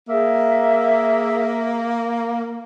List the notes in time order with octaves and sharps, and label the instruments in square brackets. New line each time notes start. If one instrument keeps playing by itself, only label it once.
[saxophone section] A#3 [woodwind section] G#4 E5